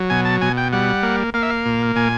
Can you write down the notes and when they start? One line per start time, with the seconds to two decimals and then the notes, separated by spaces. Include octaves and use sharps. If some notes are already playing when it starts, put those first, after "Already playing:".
Already playing: F#3
0.10 B2 G#5
0.25 A5
0.41 B2 G#5
0.57 G5
0.73 G3 F#5
1.03 A#3
1.34 A#3 F5
1.43 E5
1.50 F5
1.66 A#2
1.96 A#2 G#5